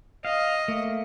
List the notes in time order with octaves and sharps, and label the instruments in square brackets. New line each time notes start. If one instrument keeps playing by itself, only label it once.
[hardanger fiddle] D#5 [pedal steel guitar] F5
[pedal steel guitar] A3 A#3